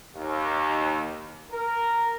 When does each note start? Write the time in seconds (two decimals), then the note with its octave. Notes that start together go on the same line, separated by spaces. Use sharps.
0.15 D#2
1.51 A#4